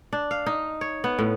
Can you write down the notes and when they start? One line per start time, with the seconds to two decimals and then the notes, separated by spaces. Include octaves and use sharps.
0.13 D4
0.31 F5
0.46 D#4
0.81 C#5
1.04 B3
1.19 A2